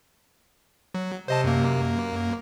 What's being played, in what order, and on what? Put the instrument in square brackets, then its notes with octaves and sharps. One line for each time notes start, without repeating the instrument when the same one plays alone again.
[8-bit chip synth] F#3
[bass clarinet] C3 [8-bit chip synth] C5 D#5 A5
[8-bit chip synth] F#2 A#3